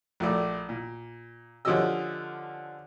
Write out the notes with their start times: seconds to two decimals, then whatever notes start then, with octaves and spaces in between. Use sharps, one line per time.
0.20 A#1 A3 D5
0.69 A#2
1.65 D3 F3 C#4 G4 D#5 E6